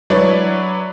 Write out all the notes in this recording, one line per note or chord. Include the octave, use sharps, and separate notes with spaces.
F#3 D4 E4 B4 C#5 D5